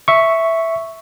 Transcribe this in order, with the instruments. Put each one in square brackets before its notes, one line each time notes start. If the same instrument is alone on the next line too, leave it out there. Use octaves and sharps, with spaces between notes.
[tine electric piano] E5 C#6